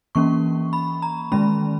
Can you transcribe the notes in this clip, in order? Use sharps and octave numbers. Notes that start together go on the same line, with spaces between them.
E3 A#3 C#4 C#6
B5
A#5
D#3 G#3 C#4 B5